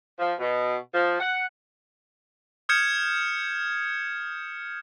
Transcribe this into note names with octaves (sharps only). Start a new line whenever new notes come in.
F3
B2
F3
F#5
D#6 F6 G6 G#6 C#7 E7